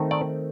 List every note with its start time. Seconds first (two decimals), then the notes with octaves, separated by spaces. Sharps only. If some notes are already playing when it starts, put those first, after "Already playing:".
Already playing: D#3 A3 C4 D#4
0.11 D5